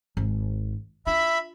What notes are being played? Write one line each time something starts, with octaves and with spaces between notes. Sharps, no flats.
G#1
D4 F4 E5 B5